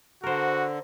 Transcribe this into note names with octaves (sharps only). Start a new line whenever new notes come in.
D3 F#4 A#4 C5